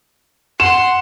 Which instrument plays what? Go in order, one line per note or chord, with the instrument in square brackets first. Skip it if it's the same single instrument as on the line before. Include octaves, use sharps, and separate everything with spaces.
[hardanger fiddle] F#5 C6 [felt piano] E7